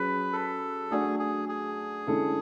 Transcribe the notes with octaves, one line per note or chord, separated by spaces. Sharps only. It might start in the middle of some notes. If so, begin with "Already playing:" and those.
Already playing: F#3 C#4 G#4 B4
A4
A3 D4 F#4 G#4
G#4
G#4
D3 G#3 C#4 E4 A4